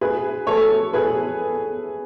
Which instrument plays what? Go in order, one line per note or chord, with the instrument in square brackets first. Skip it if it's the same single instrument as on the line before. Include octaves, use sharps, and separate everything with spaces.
[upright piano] G#4 B4
A4 C#5
G#4 B4